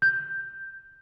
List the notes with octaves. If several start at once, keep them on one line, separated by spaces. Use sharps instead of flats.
G6